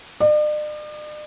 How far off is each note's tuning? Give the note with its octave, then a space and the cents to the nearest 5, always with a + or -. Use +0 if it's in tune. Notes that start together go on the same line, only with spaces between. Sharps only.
D5 +45